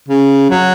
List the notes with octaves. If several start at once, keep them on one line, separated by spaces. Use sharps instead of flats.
C#3
F#3